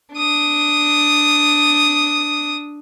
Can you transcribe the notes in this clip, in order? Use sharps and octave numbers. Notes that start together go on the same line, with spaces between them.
D4 D#6